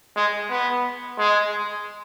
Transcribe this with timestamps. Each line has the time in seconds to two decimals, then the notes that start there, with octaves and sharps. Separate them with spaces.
0.16 G#3
0.50 B3
1.18 G#3